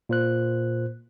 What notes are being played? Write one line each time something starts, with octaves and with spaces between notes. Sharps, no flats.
A#2 C5 F#6